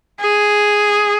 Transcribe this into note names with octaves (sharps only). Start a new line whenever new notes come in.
G#4